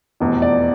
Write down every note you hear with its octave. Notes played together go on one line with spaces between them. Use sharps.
F1 E2 B2
D5